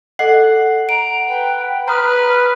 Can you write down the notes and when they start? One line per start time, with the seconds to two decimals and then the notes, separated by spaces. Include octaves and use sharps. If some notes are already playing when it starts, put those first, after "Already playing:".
0.19 A4 D#5 F#5 C7
0.89 A#5 D7
1.28 B4 G5
1.88 B4 A#5 D#6 F6